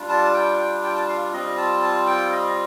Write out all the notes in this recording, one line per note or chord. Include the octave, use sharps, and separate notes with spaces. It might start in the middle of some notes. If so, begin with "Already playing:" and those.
Already playing: G3 D4 F4
A5
G5
G5
G5
A5
F5
G3 C4 F4 D#5
A5
A5
G5
D#5